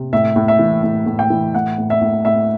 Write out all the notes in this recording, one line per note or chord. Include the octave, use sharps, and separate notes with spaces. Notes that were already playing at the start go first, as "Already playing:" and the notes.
Already playing: C3
A2 E5
A2
E5
E3
A2
A2
G5
E3
A2 F#5
A2
E5
A2
A2 E5